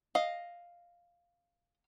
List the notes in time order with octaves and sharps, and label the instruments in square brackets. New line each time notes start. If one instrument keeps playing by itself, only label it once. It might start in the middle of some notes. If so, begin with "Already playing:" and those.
[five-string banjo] D#5 [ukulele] F5